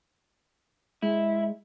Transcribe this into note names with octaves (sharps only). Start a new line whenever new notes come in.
G#3 E4